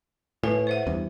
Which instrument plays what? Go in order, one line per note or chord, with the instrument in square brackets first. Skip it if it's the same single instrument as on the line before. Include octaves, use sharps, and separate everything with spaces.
[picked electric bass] A2 [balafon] B4 G#5
[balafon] C5 E5 F#5
[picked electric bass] E2 G2